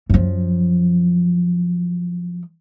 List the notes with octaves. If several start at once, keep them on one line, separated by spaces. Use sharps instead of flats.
F#2 F3